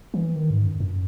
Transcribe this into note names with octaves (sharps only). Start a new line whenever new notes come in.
E3
D#3
G#2
F#2
F#2